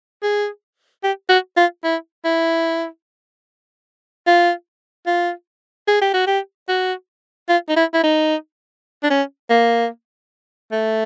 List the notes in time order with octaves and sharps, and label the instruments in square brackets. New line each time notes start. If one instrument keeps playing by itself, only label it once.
[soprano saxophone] G#4
G4
F#4
F4
E4
E4
F4
F4
G#4
G4
F#4
G4
F#4
F4
D#4
E4
E4
D#4
D4
C#4
A#3
A3